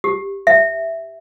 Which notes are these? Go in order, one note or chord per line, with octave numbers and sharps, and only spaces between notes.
G4
E5